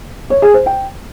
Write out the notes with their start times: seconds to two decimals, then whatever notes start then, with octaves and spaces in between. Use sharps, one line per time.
0.30 C#5
0.42 G#4
0.54 C5
0.66 G5